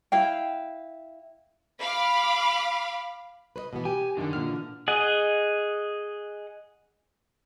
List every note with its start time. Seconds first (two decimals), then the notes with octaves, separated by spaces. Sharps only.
0.12 E4 F5 G5
1.80 F5 B5 D6
3.56 B4 C5 D#5
3.73 B2 E3 B3
3.85 G4 G#5
4.17 F#2 D3 D#3 D4
4.33 A#2 F6
4.47 E3
4.88 G#4 D#5 F#5